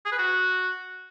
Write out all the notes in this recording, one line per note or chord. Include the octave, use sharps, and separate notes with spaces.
G#4
B4
F#4